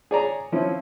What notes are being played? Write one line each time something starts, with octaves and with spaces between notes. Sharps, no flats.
G#4 C#5 D5 A5 A#5
F3 C4 C#4 E4